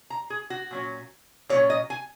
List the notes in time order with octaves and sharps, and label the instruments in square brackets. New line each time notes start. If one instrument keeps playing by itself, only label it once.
[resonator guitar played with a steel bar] A#5
G#4
F#4
A#2 F#3 C#4
A#2 F#3 C#4 C#5
D#5
G#5